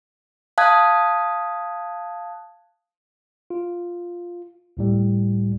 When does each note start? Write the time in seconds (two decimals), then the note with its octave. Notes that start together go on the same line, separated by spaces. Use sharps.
0.58 F5 A5 D#6 F#6 G#6
3.50 F4
4.77 C#2 A2 G3